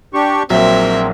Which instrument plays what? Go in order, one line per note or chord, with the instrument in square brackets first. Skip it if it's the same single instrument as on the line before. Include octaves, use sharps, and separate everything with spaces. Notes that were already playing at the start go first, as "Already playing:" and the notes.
[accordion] D4 G4 C#6
[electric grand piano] A#1 F#3 [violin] A#3 E5 [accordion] C4